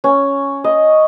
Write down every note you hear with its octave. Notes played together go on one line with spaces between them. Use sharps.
C#4
D#5